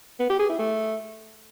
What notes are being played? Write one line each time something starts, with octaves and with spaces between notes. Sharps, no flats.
B3
G4
G#4
E4
A3